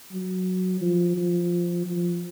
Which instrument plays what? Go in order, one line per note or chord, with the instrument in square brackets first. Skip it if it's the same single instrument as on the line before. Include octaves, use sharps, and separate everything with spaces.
[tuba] F#3
F3
F3
F3